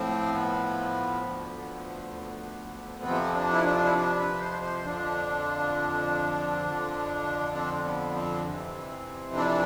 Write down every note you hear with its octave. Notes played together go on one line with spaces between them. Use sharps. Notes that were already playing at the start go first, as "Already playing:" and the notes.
Already playing: A2 F3 C4
B3
D2 D3 F3
F2 C3 F3 C4
D4
E4
D4
E4
D4
B4
C5
C5
F2 D3 F3 D4
F2 D3 F3
C4
B3
C4
F2 C3 E3
D4